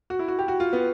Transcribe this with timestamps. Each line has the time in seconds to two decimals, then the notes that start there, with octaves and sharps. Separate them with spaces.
0.10 F#4
0.19 E4
0.28 F#4
0.39 G4
0.48 F#4
0.60 F4
0.73 B3